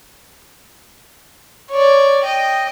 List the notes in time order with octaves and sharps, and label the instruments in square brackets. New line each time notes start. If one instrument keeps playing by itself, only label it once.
[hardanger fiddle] C#5 D5
D#5 G5